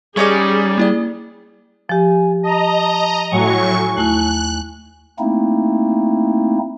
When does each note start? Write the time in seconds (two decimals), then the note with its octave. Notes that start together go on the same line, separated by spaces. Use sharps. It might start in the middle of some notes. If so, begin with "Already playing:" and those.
0.17 G3 C#4 D#4 G#4 D5
0.78 A#3 E4 D5
1.89 F3 G4 G#5
2.43 D#5 A5 A#5
3.31 A2 F#3 G#5 C#6
3.96 D#2 A3 E4 F#6
5.19 A3 A#3 C4 D#4 E4